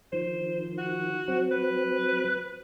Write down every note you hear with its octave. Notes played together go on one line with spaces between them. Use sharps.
D#3 F3 C5
F#4
F#3 C4
B4